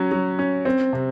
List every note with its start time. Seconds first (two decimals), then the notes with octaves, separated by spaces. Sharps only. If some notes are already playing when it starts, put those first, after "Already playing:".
Already playing: F#3 C#4
0.12 F#3
0.39 C#4
0.65 C4
0.93 C3